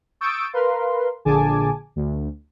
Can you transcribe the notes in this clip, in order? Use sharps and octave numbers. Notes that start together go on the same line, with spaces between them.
C#6 D#6 E6 G6 A6 D7
A#4 B4 F5 C6
A#1 D3 G#4 G#5 A5 D6
D2